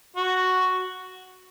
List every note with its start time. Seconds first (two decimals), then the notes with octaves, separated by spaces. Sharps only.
0.16 F#4